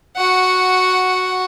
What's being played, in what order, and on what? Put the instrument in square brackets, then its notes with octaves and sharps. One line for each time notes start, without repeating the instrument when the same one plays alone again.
[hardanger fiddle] F#4 F#5